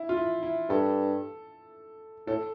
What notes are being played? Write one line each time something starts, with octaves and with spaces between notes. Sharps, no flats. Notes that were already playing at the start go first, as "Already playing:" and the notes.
Already playing: E4
F4
E4
E4
G2 A4
A2 A4